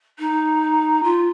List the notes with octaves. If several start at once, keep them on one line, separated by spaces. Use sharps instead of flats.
D#4
F4